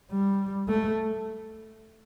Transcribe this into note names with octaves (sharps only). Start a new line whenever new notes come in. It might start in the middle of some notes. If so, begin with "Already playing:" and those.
G3
A3